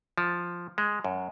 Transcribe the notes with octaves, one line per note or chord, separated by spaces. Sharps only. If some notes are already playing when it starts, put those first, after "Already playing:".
F3
G#3
F#2